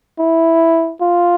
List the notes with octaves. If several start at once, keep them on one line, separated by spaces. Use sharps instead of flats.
E4
F4